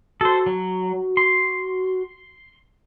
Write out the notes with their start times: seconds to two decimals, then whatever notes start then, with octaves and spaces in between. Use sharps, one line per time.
0.21 F#4 A4 C5
0.46 F#3
1.17 C6